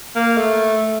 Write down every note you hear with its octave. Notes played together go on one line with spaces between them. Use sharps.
A#3
A3